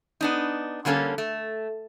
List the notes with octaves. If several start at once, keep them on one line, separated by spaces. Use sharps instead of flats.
B3 D4 D#4
D3 G3 A#3 C#4 A4
A3